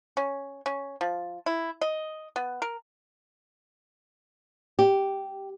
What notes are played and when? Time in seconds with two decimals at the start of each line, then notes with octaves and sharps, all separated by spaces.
0.17 C#4
0.66 C#4
1.01 F3
1.46 E4
1.81 D#5
2.36 B3
2.62 A#4
4.79 G4